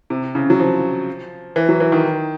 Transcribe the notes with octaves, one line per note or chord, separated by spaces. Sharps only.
C3
C#3
F#3
F3
E3
F#3
E3
D#3